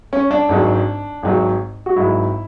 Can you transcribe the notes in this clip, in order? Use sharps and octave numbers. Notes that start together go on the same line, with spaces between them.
C#4
D4
G#1 G#2 F#3
G#1 G#2 F#3
F#4
G#1 G#2 F#3 E4